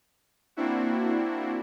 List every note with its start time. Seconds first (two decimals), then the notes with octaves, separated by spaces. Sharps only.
0.56 A#3 C4 D4 E4 F#4